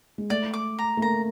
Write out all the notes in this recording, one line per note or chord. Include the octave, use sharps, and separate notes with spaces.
G#3
A3 D5
D6
A#5
A3
A#3 A#5